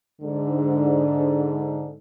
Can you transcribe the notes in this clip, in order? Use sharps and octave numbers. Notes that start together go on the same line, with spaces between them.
G#2 D3